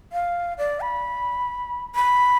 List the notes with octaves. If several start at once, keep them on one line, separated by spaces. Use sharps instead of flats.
F5
D5
B5
B5